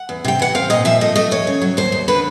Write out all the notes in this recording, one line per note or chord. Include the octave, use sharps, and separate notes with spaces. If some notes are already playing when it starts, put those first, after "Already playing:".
Already playing: F#5
E2
C3 G5
E3 F#5
C4 F5
A#2 D#5
F3 E5
A3 D#5
A3 D#5
D#2 C#5
C#3
F#3
D#2 C5
D#2
D3 B4